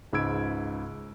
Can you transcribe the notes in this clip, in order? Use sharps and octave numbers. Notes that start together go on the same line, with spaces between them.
C#2 G#2 B5 E6 G#6 D7